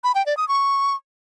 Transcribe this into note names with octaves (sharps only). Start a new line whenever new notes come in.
B5
G5
D5
D#6
C#6